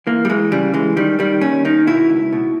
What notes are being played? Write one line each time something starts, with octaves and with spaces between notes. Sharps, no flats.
E3 A#3
G3
E3 G#3
C#3 G3
E3 G#3
D#3 G3
D#3 G3
D#2 C#4
D#3 D#4
B2 E4
C#2
B2